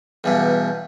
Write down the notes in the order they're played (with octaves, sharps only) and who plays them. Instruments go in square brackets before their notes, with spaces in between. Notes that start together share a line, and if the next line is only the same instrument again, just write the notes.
[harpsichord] E2 G2 B2